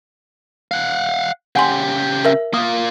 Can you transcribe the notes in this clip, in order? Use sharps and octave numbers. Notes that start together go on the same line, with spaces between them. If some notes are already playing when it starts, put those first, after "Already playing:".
F5 F#5
C#3 G4 F#5 G#5 C6
A#4 E5
A#3 F4 D#6